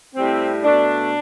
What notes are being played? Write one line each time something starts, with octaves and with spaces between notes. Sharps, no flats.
A2 G3 C4
B2 A3 D4